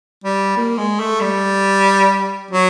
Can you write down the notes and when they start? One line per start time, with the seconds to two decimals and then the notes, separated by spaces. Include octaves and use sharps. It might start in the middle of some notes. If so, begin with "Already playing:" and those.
0.24 G3
0.57 A#3
0.78 G#3
1.00 A3
1.21 G3
2.51 F#3